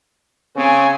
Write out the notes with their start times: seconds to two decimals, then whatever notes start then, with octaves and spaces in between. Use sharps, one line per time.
0.56 C#3 C4 G#5